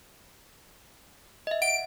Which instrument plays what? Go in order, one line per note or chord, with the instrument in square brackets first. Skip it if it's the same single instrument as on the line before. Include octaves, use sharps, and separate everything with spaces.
[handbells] D#5 E5
[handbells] F#5 [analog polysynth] D7